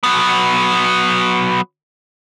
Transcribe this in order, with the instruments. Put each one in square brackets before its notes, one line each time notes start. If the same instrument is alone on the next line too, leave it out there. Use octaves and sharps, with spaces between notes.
[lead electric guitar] F#3 B3